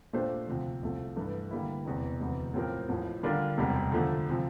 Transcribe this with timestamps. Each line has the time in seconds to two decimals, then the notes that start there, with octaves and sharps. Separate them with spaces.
0.13 A#2 A3 D4 G4 C5
0.47 D2 C3 F3
0.82 C2 C3 F3 A3
1.16 G2 E3 A3
1.51 D3 G3 A#3 E4
1.85 E1 E2 C3
2.20 E1 D2 C3 E3
2.54 A2 F3 C4 G4 A#4
2.89 A1 A2 F3
3.23 D3 G3 D4 F4 A#4
3.58 E1 D2 C3 G3
3.92 D3 F3 A3
4.29 C3 F3